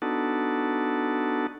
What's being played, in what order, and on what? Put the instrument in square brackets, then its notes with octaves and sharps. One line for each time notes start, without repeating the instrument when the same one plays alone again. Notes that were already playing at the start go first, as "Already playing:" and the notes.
[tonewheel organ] B3 D4 D#4 F#4 A4